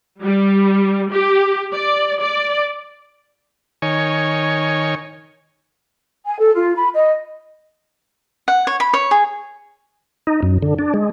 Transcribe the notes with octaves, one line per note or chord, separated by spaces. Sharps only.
G3
G4
D5
D5
D#3 C#5 G#5
G#5
A4
F4
B5
D#5
F#5
C#5
B5
C#5
G#4
D#4
F#2
D3
D4
G#3